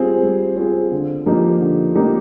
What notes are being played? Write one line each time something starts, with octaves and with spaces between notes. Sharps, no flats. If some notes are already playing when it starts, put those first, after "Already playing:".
Already playing: G3 C4 F4 G#4
G3
C4 F4 G#4
D3
F3 A#3 D#4 G4
D3
F3 A#3 D#4 G4